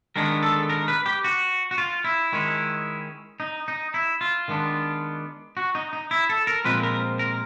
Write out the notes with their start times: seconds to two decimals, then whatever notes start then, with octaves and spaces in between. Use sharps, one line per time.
0.16 D#3 G#3 B3 D4 A#4
0.43 A4
0.70 A#4
0.88 B4
1.06 G4
1.24 F#4
1.71 F#4
1.78 F4
2.04 E4
2.33 D#3 G#3 C#4
3.40 D#4
3.68 D#4
3.94 E4
4.21 F4
4.48 D#3 G#3 B3 D4
5.57 F#4
5.75 D#4
5.93 D#4
6.11 E4
6.29 A4
6.47 A#4
6.65 A#2 F3 G#3 C4 B4
6.83 A#4
7.19 A#4